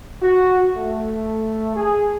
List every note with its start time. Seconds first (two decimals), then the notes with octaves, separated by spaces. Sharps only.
0.22 F#4
0.77 A3
1.76 G#4